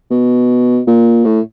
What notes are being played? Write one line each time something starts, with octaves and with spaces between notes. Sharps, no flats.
B2
A#2
A2